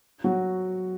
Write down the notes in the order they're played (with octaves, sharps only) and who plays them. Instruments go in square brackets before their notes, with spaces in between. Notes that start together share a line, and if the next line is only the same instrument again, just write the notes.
[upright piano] F#3 F#4